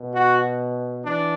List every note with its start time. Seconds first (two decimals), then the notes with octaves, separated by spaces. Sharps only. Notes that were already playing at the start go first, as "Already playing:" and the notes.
Already playing: B2
0.14 F#4
1.04 E3 D4